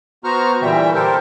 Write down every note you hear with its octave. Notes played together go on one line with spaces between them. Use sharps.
B3 F#4 C5 A#5 C#6 F6
A#2 D3 E3 G3 E5 G5
G4 A4 A#4 C5